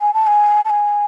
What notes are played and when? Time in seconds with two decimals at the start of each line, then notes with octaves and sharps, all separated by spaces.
0.01 G#5
0.14 A5
0.27 G#5
0.65 A5
0.70 G#5